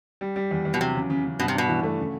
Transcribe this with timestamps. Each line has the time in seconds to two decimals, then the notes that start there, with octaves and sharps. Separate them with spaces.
0.21 G3
0.36 G3
0.51 E2
0.65 E2
0.74 B2
0.80 C3 F#3
0.95 C#3
1.10 C#3
1.25 C#3
1.39 G2 B2
1.48 C3
1.54 B2 D4
1.68 E3
1.83 A3
1.98 C#3